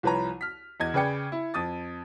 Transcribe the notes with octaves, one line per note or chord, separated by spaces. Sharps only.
C2 F3 B4 C#5 A#5
F6 B6
E2 D#5 G#6
C#3 G#4 B4 D5 G5 C#7
E4
F2 D#6 A6